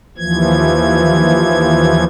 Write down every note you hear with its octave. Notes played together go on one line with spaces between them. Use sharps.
D#2 E3 F3 G#6